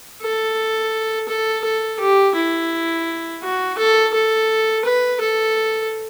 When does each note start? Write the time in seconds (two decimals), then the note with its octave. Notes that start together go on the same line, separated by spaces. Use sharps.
0.23 A4
1.28 A4
1.64 A4
2.00 G4
2.35 E4
3.43 F#4
3.78 A4
4.14 A4
4.85 B4
5.21 A4